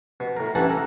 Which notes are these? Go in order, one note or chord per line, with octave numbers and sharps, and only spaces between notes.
B2
A2 A#4
G2 E3 C#4 F#5 A5 C#6
A4 A#4